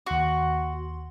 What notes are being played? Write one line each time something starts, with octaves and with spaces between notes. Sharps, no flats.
D#2 F#4 C6